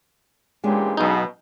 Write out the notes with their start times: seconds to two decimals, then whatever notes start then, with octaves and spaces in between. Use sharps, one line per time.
0.64 E2 A#2 G#3 C#4 D4 G4
0.97 B1 B2 D#4